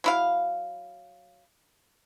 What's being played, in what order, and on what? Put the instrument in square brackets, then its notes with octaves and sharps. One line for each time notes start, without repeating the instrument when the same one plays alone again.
[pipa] F#3 E4 F5